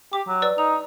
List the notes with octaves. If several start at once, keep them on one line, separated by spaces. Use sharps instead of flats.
G4 D6
F#3
B4 D5 E6
D#4 F7